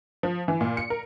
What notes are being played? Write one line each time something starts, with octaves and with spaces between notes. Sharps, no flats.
F3
E3
A#2
C#7
A#4